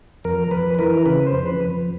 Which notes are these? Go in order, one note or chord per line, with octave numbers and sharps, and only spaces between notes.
F2 A#4
F2 B4
B4
E3 A#4
C#3 B4
C5
F2
B4
F2